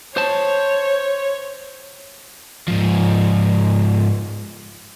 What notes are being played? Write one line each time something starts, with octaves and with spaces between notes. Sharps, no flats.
C5 C#5 A5
G#2 F3